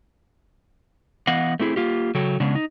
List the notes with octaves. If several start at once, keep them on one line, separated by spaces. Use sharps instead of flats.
E3 B3 D#5 F5 F#5
A3 C4 E4 G#4
A#3 F4 G4
C#3 F#3 A4 G5
C#3 G#3 B3 C#4 D4
D#4